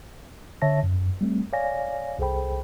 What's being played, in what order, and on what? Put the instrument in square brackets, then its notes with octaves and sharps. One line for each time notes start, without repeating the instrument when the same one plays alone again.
[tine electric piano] D3 C#5 E5 A5 A#6
F#2
G3 A3 C4
C#5 D5 F5 G#5 A#6
C2 G#4 A4 C5 G5 B5